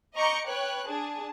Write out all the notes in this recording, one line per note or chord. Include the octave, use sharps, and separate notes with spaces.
D#5 A#5 C#6 D6 G6 C#7
B4 C#5 G5 F#6
D4 G#4 A5